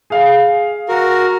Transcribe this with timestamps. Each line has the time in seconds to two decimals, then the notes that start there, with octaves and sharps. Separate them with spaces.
0.10 G#4 F5
0.89 F#4 A#4